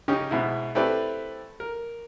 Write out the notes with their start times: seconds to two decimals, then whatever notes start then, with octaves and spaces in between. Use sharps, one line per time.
0.08 C#3 C#4 D#4 G4
0.31 G#2 B2 E4
0.75 A3 C4 E4 G4 B4 D5
1.60 A#4